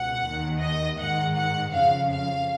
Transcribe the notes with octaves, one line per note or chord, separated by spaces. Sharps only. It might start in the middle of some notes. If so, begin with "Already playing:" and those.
Already playing: C#2 B2 F#5
D#2 D#3
D#5
G#2 D#3 F#5
F#5
F2 C#3 F3 F5
F5